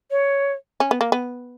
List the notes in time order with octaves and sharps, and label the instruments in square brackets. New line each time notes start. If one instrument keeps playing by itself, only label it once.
[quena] C#5
[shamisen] C#4
B3
A#3
B3